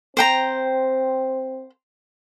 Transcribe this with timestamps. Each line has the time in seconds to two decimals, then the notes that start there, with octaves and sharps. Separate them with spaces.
0.17 C4 C5 G5 A#5